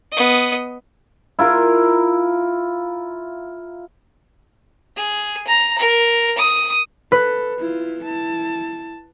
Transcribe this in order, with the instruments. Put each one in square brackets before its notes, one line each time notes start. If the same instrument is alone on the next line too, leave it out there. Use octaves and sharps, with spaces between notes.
[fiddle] B3 D#5
[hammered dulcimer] E4 F4 A#4
[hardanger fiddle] G#4
A#5
A#4
D#6
[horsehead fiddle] A4 [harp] B4
[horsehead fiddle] E4 F4
E4 A5